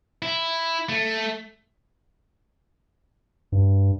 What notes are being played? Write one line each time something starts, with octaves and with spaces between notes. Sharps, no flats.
E4
A3
G2